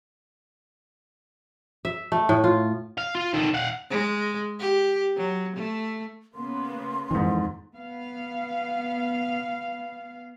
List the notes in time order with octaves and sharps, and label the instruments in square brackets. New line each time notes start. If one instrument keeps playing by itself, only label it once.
[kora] E5
A3
A2
F4
[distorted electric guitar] F5
F4
D#3 A4
F5 F#5
[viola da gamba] G#3
G4
F#3
A3
[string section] C#3 A#3 B3 [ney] C6
[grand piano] F2 G#2 [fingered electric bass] D#3 E3
[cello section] B3 F5